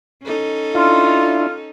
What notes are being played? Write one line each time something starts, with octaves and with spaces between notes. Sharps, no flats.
C#4 D#4 A4
D4 E4 F4